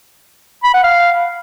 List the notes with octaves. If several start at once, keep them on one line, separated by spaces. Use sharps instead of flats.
B5
F#5
F5